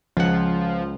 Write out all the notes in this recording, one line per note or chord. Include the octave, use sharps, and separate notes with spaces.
C#2 F3 F#5